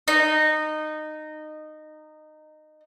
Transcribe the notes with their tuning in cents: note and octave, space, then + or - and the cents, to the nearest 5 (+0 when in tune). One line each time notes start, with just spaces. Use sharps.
D#4 -20